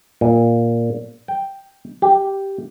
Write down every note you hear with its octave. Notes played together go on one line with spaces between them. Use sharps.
A#2
G5
G4